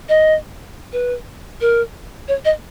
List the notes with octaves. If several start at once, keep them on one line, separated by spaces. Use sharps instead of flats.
D#5
B4
A#4
C#5
D#5